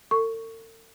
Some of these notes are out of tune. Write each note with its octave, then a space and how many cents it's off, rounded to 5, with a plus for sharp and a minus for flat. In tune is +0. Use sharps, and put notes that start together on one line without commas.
A4 +45 C#6 +5